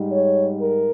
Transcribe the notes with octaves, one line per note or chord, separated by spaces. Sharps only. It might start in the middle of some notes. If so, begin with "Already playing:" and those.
Already playing: G#2 G3
C#5
A#4